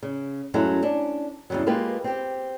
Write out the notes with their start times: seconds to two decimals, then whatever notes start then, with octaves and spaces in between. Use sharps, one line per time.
0.03 C#3
0.54 F#2 F#3 G#3 A3 C#4 E4
0.82 C#4 D4
1.50 E2 G2 A#2 C#3 F#3
1.66 G#3 A#3 F4 G4 B4
2.04 C4 G4